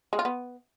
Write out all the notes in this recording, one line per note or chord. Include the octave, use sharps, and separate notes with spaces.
G#3
F4
B3